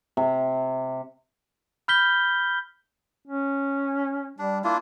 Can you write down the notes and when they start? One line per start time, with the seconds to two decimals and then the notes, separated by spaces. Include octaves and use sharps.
0.17 C3
1.88 B5 F6 G6 B6 G7
3.27 C#4
4.39 G3 D4
4.64 A#3 D4 E4 F4